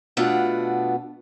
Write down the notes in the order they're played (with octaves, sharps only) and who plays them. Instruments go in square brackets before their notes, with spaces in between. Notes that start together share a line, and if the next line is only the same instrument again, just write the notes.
[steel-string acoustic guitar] B2 A3 B3 D4 F4 F#5